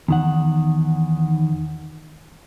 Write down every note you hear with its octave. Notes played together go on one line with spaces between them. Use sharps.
E2 D#3 F#5